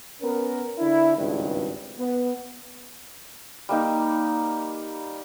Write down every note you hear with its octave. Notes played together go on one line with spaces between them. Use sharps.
B3 C#4 A#4
D3 D4 E4
G#1 C#2 G2 D#3 G3
B3
G3 A#3 D#4